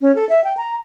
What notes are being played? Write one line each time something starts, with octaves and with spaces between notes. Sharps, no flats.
C#4
A4
E5
G5
A#5